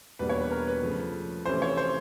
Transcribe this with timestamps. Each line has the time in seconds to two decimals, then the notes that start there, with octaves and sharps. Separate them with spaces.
0.19 E2 B2 G3 A#3 D4 B4
0.29 C#5
0.41 B4
0.51 A#4
0.67 B4
0.83 C#3 F3 A3
1.46 C3 E3 A3 C#4 E4 C5
1.62 C#5
1.77 C5